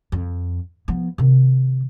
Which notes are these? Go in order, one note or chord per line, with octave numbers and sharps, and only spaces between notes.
F2
F3 B3
C3 D#3